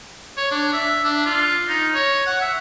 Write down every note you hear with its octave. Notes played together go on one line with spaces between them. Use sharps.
C#5
D4
E5
D4
F4
D#4
C#5
F#5
E5